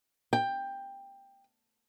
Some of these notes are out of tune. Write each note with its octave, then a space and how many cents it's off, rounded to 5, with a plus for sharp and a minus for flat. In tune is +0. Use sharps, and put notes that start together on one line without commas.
G5 +10